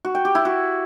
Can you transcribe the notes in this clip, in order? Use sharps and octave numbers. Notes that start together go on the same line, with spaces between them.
F#4
G5
G4
E4
F#4